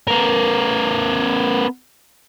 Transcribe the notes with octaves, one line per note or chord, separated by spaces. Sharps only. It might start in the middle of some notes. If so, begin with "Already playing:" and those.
B3 A#4